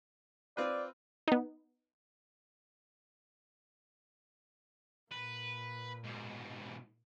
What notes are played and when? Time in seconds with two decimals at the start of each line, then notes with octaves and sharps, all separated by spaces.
0.57 C4 F4 B4 D5
1.28 B3 D#4
5.11 A#2 B4
6.04 G#2 B2